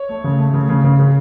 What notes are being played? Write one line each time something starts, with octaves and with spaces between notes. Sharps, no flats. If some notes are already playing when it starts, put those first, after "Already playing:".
Already playing: C#5
A3
C#3
A3
C#3
C#3
C#3
C#3